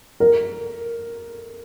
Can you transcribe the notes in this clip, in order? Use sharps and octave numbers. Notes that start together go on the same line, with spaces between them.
A#4